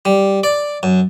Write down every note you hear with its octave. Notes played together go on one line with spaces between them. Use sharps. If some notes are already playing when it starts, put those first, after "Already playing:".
G3
D5
F#2